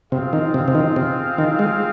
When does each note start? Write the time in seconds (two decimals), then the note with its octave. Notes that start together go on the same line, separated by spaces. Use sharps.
0.12 C3 C4 F4 G#4 F5
0.33 D#3
0.54 C3
0.68 C3
0.75 D#3
0.96 C3
1.38 D#3
1.59 G#3